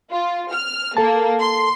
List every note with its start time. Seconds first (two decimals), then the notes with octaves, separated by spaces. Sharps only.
0.12 F4
0.52 F6
0.97 A#3 A4 A5
1.41 C6